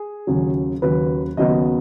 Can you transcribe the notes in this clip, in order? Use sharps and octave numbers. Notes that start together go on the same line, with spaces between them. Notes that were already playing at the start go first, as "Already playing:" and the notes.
Already playing: G#4
D#2 C#3 F#3
D#2 C#3 F#3 B4
D#2 C#3 F#3 B3 D#5